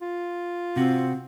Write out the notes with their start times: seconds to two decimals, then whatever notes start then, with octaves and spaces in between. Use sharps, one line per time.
0.02 F4
0.76 C3 C4 F#4